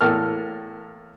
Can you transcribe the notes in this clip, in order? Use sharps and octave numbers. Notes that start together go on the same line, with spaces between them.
E2 A2 A#3 A4 F6